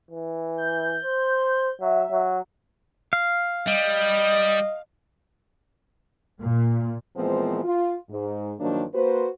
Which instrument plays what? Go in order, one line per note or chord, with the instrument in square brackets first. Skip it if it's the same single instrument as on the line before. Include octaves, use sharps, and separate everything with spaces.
[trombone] E3
[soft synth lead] G6
[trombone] C5
[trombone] F#3 [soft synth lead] E5
[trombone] F#3
[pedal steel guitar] F5
[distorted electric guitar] G3 [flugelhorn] D#5
[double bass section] A#2
[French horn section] A#2 E3 F3 G#3 B3 C4
F4
G#2
G2 D#3 F3 F#3 A#3 D4
A#3 F#4 B4 C5